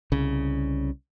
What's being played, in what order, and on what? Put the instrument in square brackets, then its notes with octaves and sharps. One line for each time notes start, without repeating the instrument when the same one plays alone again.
[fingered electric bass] C2 C#3